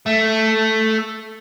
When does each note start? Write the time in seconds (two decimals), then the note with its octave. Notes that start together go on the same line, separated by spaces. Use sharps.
0.06 A3